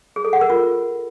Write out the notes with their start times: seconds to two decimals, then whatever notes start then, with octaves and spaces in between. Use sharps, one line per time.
0.16 G#4
0.25 A4
0.33 F#5
0.41 A#4
0.50 F4